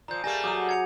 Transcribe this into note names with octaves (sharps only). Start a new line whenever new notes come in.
A#2 F3 A#5 G6
G3 A3 A#3 G#4 G#5 A#6
F#3 F#4 D6 D#6 D#7
G#6 C#7 F7